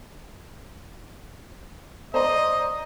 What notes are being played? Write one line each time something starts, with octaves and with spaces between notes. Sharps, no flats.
C5 D5 D#5 A#5